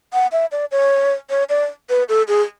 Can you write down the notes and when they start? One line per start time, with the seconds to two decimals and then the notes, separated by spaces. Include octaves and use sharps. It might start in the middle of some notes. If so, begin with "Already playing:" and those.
0.13 F#5
0.32 E5
0.52 D5
0.71 C#5
1.30 C#5
1.49 D5
1.90 B4
2.09 A4
2.28 G#4